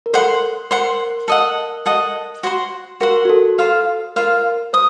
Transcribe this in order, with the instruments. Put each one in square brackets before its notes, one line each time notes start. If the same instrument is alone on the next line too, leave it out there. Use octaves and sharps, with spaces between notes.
[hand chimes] A#4
[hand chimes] A4 [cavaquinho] C5 F#5 C6
[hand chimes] A#4 [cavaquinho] C5 F#5 C6
[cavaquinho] A4 D#5 F#5
A4 D#5 F#5
F#4 C5 F#5 C6
[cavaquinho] F#4 C5 F#5 C6 [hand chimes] A#4
[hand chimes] F#4
A4
[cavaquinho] F4 C5 F5 [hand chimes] A4
[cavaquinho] F4 C5 F5 [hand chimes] A#4
[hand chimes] C5 [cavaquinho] D#6